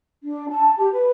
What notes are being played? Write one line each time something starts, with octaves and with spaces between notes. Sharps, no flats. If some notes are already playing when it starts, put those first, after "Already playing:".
D4
A5
G4
B4